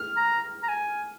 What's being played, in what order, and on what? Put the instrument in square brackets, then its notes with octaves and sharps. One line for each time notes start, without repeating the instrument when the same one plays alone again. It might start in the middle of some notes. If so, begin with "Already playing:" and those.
Already playing: [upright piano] F6
[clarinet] A#5
A#5
G#5